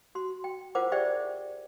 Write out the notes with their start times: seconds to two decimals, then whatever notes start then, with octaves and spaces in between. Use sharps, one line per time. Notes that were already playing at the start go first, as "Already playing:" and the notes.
0.15 F#4 C6
0.44 G5
0.75 E4 F4 A#4 C5 F#5 D6
0.92 G4 G#4 C5 D5 E5 G5